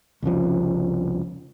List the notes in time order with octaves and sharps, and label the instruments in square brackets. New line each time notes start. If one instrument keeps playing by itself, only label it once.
[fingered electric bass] C2 F2 C#3 F3